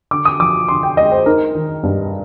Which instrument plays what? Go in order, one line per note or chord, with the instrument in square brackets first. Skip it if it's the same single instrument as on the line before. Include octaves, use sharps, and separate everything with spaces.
[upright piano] D3 D6
D#6
F3 D6
D3 C6
G5
G#3 D#5
C5
D#4 A#4
D#3
G2